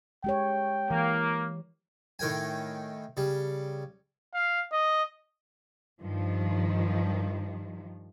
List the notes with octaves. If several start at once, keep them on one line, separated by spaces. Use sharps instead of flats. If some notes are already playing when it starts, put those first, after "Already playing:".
G#3 G4 C#5 G5
E3 A#3
A2 D#3 A#4 G5 G#5
C#3 G3
F5
D#5
G2 D#3 F3